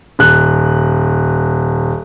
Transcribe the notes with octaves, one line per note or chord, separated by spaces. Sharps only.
D#1 F#6